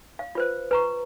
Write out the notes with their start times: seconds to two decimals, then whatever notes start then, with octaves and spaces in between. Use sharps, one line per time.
0.19 F5
0.35 F4 B4 C5
0.71 B4 A#5 C#6